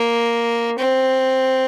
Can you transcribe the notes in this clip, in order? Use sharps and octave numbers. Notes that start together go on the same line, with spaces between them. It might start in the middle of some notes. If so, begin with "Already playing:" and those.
Already playing: A#3
C4